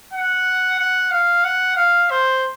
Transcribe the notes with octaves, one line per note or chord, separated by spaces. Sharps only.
F#5
F#5
F5
F#5
F5
C5